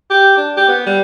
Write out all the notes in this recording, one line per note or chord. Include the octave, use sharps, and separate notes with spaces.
G4
D4
G4
B3
G3